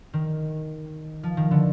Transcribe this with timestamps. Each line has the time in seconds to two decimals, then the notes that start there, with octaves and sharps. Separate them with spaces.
0.13 D#3
1.23 F3
1.37 D#3
1.51 D3